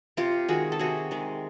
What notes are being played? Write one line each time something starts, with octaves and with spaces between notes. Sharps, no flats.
C3 F4 G4
D#3 G#3 F#4 G#4
A4
C3 F#4 G#4
D#3 G#3